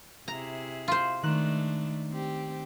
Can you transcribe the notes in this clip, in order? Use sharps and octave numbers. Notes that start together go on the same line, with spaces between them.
C3 E4 G#4 A#5
F4 C5
D#3 G#3 A3 D4 F#6 E7
C4 G4